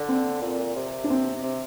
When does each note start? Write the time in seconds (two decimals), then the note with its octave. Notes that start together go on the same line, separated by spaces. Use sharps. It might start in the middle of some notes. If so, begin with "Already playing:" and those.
Already playing: D3
0.09 C4
0.41 A#2
0.59 A#2
0.76 C3
1.04 D4
1.10 C4
1.43 C3